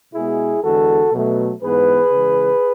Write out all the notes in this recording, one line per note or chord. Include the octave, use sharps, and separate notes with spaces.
B2 G#3 B3 E4 G#4
E2 D3 G#3 F#4 A4
B2 F#3 A3
G#2 E3 B3 G#4 B4
C#3 E3 G#3